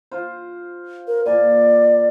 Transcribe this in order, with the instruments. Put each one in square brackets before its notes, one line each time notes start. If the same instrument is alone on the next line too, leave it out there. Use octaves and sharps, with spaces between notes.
[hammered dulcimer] F4 C5
[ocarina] A#4
[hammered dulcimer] A#2 G#5 [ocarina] D5